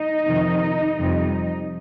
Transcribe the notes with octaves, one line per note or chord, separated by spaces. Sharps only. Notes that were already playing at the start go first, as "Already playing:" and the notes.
Already playing: D#4 D#5
F2 C3 D#3
F2 C3 G3